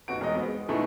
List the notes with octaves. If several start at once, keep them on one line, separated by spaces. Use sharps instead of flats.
F1 B2 F#4 D7
E1 D#5
B3 C4
G#3
B2 G#3 A3 D#4 E4 G#4